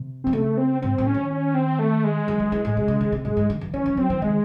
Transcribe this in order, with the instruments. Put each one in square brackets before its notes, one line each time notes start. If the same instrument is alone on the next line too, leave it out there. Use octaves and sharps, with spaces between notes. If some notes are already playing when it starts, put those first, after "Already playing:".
Already playing: [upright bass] C3
[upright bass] D#3 [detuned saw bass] C4
[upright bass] C#3 [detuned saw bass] A3
[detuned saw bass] C4
[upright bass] G#2 [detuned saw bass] C4
[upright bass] A2
[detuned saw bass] C#4
[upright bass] D#3
[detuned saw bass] C#4
C4
A3
G#3
[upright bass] E3
E3
E3
A2
C3
C#3
D#3
C3
[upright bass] G#2 [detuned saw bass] G#3
[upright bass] G#2
D#3
E3
[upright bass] E3 [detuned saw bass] C#4
[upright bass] E3
[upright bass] F#3 [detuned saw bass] C4
[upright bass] E3
[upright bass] D#3 [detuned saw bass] G#3